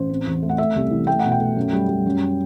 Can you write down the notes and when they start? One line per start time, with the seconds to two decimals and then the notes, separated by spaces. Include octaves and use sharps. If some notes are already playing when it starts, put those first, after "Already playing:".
Already playing: A1 C5
0.10 C4
0.26 E2
0.43 A3
0.49 F#5
0.58 A3 E5
0.75 C2
0.91 E3
1.07 A3 G5
1.19 B2 F#5
1.32 G5
1.41 A3
1.56 F#2
1.73 G3
1.89 G3
2.06 F#2